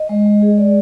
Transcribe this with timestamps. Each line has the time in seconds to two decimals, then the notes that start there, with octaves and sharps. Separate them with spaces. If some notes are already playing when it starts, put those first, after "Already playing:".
Already playing: D#5
0.09 G#3
0.26 G#3
0.42 G#4
0.58 D5